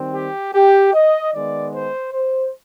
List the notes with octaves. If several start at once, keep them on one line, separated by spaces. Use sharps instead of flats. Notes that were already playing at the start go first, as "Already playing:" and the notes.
Already playing: D#3 G3 C4
G4
G4
D#5
D#3 G#3 B3 D5
C5
C5